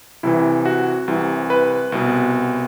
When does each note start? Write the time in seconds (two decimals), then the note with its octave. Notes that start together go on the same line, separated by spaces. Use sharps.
0.23 C2 C3 E3 E4
0.65 F#4
1.08 C2 C3 E3
1.50 B4
1.92 C2 B2